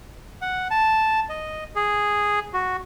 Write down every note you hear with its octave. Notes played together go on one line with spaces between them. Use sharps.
F#5
A5
D#5
G#4
F#4